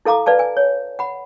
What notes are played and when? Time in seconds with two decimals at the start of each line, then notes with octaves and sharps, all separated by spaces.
0.05 E4 A4 F5 A#5 D6
0.26 B4 D5 F5 A5
0.39 G#5
0.57 C#5
0.99 F#5 B5